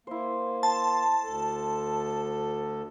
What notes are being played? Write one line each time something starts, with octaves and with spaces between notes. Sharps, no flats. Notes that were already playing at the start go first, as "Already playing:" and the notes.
A#3 E4 C5
A5 C6
D2 A4